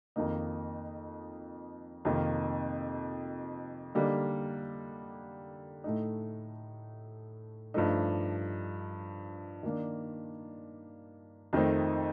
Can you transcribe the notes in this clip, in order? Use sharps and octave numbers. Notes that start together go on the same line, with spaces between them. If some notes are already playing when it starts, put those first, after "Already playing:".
F2 D#3 A#3 D#4
F2 C3 D#3 A#3
D3 G3 A#3 D#4
A2 A3 D#4
G2 F3 A3 D#4
D#3 A#3 D4
F2 D#3 A3 C4 D#4